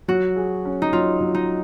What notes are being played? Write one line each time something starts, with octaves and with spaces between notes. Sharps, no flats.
F#3 F#4
G#4
C#4
D#4
F#3 F4
F#3
D#4